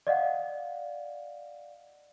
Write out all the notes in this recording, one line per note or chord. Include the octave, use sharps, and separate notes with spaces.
D5 D#5 F5 F#5